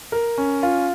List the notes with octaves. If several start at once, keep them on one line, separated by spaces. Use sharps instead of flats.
A#4
C#4
F4